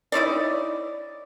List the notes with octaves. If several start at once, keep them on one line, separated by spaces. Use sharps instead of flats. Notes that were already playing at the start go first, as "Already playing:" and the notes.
D#4 E4 C#5 D5